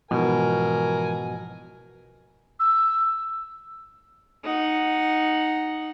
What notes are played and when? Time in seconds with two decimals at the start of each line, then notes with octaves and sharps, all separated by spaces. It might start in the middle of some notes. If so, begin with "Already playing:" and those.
0.11 G#2 B2 E3 F3 A#4 G#5
2.60 E6
4.43 D#4 F#5